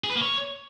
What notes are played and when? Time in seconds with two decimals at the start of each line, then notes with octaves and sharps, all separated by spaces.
0.04 G#4
0.10 B4
0.15 A#3
0.21 C#5